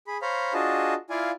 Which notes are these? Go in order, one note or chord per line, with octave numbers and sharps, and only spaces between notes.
G#4 B5
C5 C#5 F5 A#5 B5
D4 F4 F#4 G#4 D#5 A5
E4 F4 D5 F5 G#5